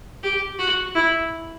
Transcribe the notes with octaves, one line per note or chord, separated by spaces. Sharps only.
G4
F#4
E4